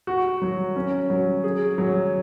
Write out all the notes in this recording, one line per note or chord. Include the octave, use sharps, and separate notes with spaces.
F#4
F#3
C#4
F#3
G#4
F#3